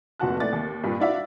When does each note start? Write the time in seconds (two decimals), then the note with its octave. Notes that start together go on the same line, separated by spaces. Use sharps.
0.20 F1 D2 A#2 F#4 A5 F#6
0.40 A2 A3 D5 A6
0.53 D#2
0.84 G2 A#2
1.00 D4 E4 F#4 D5 E5 F5